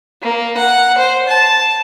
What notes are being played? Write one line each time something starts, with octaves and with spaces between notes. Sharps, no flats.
A#3
F#5
C5
A5